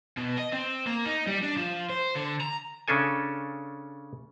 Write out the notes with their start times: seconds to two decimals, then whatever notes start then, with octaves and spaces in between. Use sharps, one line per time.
0.17 B2
0.38 D#5
0.53 C4
0.87 A#3
1.05 D#4
1.27 G3
1.43 D4
1.56 F3
1.90 C5
2.16 D3
2.41 A#5
2.88 C#3 C#4 D4 A4 G#5